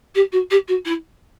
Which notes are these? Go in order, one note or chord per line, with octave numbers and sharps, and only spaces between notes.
G4
F#4
G4
F#4
E4